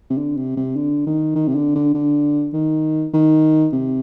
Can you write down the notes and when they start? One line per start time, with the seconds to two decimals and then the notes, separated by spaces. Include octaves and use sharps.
0.10 C3
0.18 D3
0.37 C3
0.57 C3
0.76 D3
1.07 D#3
1.36 D#3
1.48 C3
1.55 D3
1.75 D3
1.95 D3
2.54 D#3
3.14 D#3
3.73 C3